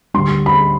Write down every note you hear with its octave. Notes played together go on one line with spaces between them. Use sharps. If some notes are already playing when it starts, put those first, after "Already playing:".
D2 D3 G3 C6
B5